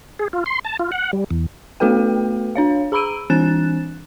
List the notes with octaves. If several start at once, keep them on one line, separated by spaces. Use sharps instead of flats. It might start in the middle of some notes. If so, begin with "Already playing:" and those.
G#4
F4
C6
A5
F4
F#5
G3
E2
A3 B3 F#4 A4 B4 G5
D4 C#5 F5
G#4 A#5 B5 E6 D7 D#7
E3 C4 D4 F#6 A6 E7